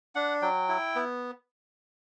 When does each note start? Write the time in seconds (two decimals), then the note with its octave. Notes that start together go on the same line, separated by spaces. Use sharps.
0.15 D4 F#5
0.42 F#3 G5
0.69 E4
0.95 B3